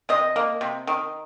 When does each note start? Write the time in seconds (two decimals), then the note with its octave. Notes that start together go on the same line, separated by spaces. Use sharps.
0.09 C3 D#5
0.36 A#3
0.61 C3
0.87 D#3